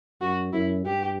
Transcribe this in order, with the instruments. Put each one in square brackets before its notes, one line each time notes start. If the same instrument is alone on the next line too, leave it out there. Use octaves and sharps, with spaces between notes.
[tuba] F#2 [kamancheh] F#4
[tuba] F#2 [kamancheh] E4
[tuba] G2 [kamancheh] G4